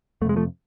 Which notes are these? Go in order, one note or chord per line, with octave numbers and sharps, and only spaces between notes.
F2 C3 G#3 A3
F3 A3